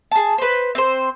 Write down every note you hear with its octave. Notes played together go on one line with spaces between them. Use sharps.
G#4 A5
B4 C5
C4 C5